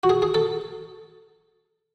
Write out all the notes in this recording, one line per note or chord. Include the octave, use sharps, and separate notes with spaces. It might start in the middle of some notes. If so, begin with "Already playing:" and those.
F#4
G#4
G#4
A4